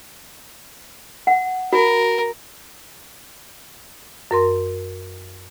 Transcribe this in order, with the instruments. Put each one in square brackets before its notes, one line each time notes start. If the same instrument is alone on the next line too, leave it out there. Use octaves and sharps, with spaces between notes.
[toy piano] F#5
[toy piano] F#4 [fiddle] A#4
[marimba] F#2 A#4 C6